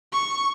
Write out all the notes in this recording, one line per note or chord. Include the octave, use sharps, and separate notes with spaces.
C#6